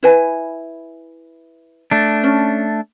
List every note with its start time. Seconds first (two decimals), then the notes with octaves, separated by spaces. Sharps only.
0.03 E4 B4 G#5
1.91 A3 D4
2.24 C#4